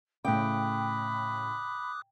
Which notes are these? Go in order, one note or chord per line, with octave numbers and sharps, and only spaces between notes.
A2 C#3 G5 B5 D6 D#6 F#6